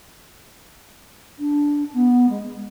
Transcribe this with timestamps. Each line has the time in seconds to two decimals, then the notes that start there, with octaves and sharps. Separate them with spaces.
1.39 D4
1.94 B3
2.29 G#3